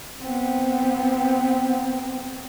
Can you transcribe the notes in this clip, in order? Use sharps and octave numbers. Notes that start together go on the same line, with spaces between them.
B3 C4